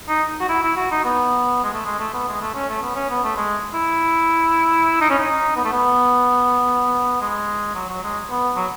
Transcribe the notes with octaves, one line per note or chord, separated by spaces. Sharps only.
D#4
F#4
E4
E4
F#4
D#4
B3
G#3
A3
G#3
A3
B3
G#3
A3
C#4
A3
B3
C#4
B3
A3
G#3
E4
D#4
C#4
D#4
B3
A3
B3
G#3
F#3
F#3
G#3
B3
F#3